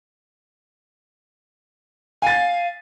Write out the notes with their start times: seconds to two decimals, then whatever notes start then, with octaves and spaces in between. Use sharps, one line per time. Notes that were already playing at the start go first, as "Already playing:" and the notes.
2.22 F5 G#5 A6